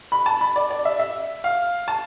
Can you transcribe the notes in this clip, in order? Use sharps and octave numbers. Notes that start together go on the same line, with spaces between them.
B5
A5
B5
D5
D5
E5
E5
F5
A5